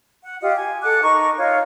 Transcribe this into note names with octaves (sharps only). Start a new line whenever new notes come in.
F#5
F4 G4 D#5
G#5
A4 F#5 D6 F#6
D#4 A#4 C#6
D#4 F4 C#5